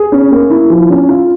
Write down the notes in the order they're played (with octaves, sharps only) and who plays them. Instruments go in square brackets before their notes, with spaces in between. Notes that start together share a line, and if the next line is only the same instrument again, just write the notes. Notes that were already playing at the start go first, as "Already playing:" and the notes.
Already playing: [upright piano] G#4
C#4
A#3
E4
F3
C#4
F4